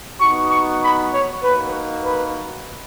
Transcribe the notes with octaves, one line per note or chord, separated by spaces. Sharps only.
B3 D#4 F#4 C#6
C#6
B5
C#5
A#3 D#4 F#4 B4
B4